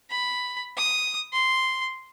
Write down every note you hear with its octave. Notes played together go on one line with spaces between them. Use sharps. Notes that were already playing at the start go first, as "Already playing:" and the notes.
B5
D#6
C6